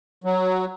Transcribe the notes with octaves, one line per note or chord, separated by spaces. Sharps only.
F#3